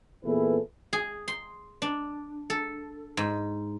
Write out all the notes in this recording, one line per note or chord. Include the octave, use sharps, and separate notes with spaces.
E2 A#2 E4 G#4 A4 B4
G#4
C6
D4
A4
G#2